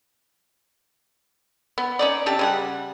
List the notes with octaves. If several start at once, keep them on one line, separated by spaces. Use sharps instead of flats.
B3
C#4 D#4 D5
C3 G4 A5
C#3 G3 F#5